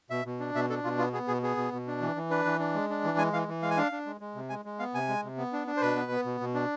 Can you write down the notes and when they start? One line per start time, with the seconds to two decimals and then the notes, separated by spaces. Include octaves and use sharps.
0.10 B2 E5
0.26 B2
0.40 D4
0.55 B2 E5
0.70 D4 A4
0.84 B2 F4
0.98 B3 F4
1.13 B3 G#4
1.28 B2 G#4
1.42 B3 G#4
1.57 B2
1.72 B2
1.87 D4
2.01 E3
2.16 E3
2.30 D4 B4
2.45 E3
2.60 D4
2.74 G#3
2.90 D4
3.04 E3
3.18 G#3 G#5
3.33 E3 F5
3.48 E3
3.62 G#3 F5
3.70 G#5
3.77 D4 F5
3.92 D4
4.06 G#3
4.21 G#3
4.35 C3
4.50 G#3 G#5
4.65 G#3
4.79 B3 F5
4.95 C3 G#5
5.09 G#3
5.24 C3
5.38 B3
5.53 D4
5.67 D4
5.77 C5
5.81 B2 B4
5.96 B3
6.11 B3
6.25 B2
6.41 B2
6.54 D4